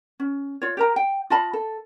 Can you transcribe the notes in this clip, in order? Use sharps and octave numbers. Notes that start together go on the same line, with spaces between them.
C#4
F4 C#5
G4 A#4 A#5
G5
F4 D#5 A5 B5
A4